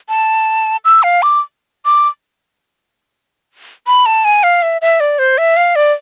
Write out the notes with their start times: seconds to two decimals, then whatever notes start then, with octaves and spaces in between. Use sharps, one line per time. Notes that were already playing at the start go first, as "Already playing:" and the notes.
0.09 A5
0.85 E6
1.03 F5
1.22 D6
1.85 D6
3.87 B5
4.06 A5
4.25 G#5
4.43 F5
4.62 E5
4.82 E5
5.00 D5
5.19 C5
5.38 E5
5.57 F5
5.76 D5